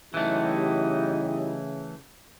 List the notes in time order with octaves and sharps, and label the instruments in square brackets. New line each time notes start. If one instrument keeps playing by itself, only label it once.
[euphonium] C#3 [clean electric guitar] E3 A3 [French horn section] F#3 D#4 E4 [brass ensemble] G4 D#5